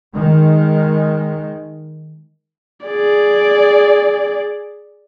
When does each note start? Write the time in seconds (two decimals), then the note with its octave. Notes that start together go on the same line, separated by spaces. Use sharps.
0.13 D#3 G#3
2.86 G#4 D5